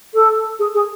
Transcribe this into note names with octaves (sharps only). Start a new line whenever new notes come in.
A4
G#4
G#4